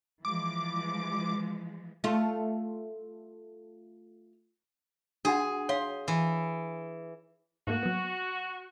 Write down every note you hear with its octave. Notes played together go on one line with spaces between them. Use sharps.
E3 F3 G#3 D6
A3 F4
D4 F#4 G#4 F#5
C#5 F5 C6
E3
G#2 A3 A#3 F#4
F#3 B3